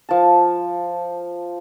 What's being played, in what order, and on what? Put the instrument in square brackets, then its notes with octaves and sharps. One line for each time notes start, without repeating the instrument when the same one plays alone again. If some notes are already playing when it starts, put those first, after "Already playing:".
[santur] F3 A5